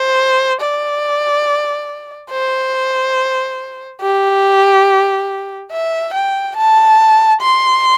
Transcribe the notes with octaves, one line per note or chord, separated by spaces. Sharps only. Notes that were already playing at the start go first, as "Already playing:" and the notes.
Already playing: C5
D5
C5
G4
E5
G5
A5
C6